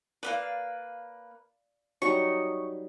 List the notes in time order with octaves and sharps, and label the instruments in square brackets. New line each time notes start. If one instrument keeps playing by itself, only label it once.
[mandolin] A#3 B3 B4 [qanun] D5 F5
[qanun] F#3 G3 D#4 [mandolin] C#6